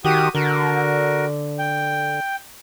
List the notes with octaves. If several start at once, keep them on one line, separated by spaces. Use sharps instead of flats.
D#3 F#4 G4 D#6
D3 F#4 A#4
G5